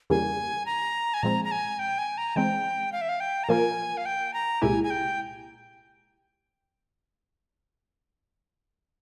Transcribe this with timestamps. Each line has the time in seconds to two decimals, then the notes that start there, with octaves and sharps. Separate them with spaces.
0.10 E2 C#3 G3 A#3 G#5
0.66 A#5
1.14 G#5
1.23 A#2 F3 G#3 C4 A#5
1.45 A#5
1.51 G#5
1.79 G5
1.98 G#5
2.18 A#5
2.36 E3 G#3 C4 G5
2.92 F5
3.01 E5
3.09 F5
3.20 G5
3.44 A#5
3.49 A#2 F3 A#3 F4 A#4 G#5
3.97 F5
4.06 G5
4.34 A#5
4.61 C2 A#2 G#3 E4 G4 G#5
4.84 G#5
4.90 G5